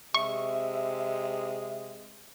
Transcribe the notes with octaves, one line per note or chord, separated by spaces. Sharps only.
C3 G#3 E5 C#6